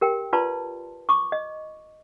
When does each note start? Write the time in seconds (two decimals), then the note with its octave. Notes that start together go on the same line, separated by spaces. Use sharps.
0.01 G4 A#4 G5
0.33 F4 B4 D5 A5 C6
1.09 C#6 D6
1.32 D#5